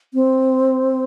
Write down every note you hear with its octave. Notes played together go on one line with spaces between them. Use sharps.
C4